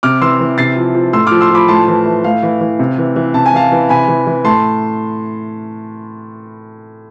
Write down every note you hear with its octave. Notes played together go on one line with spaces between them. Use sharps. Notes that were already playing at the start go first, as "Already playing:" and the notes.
C3 D6 F6
E3 C6 E6
E3
C3 A6 C7
F3
F3
A2 C6 E6
F3 D6 F6
C6 E6
F3 B5 D6
A2 A5 C6
E3
E3
A2 F5
E3
E3
C3
E3
E3
C3 A5
G#5
E3 F5 A5
E3
C3 G#5 B5
E3
E3
A2 A5 C6